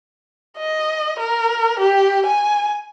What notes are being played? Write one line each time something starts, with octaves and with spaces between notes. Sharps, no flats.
D#5
A#4
G4
G#5